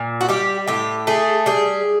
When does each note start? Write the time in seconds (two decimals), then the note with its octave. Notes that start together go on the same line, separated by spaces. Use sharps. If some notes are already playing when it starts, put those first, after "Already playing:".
Already playing: A#2
0.21 F#4
0.29 G3 G4
0.68 A2 G4
1.07 A3 G#4
1.46 G3 G#4